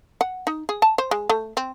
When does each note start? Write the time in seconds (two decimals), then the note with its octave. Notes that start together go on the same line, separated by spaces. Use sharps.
0.21 F#5
0.47 D#4
0.69 G#4
0.82 A5
0.98 C5
1.11 G#3
1.30 A3
1.57 C4